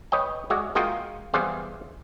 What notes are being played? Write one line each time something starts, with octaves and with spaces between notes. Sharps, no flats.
B4 C#5 D#5 G5
G#3 F#4 D5 E5
G#3 A#3 F4 F#4 D#5 G5
E2 E3 G3 G#4 C5 F5